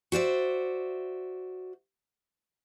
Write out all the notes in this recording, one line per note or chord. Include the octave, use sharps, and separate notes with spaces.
F#4 C5 D5 E5